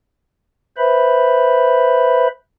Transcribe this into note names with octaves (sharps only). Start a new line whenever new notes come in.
B4 C5 E5 B5